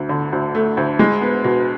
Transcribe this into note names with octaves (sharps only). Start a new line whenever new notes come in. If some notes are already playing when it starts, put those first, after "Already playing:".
Already playing: D2
D3
D2
A3
D2
G#3
B3
B2